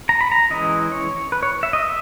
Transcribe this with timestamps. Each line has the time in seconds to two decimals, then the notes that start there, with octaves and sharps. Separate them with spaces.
0.09 A#5
0.21 B5
0.32 A#5
0.50 E3 G#3 C#4 E4 D#5
0.92 C#5
1.32 B4
1.43 C#5
1.63 E5
1.73 D#5
1.85 E5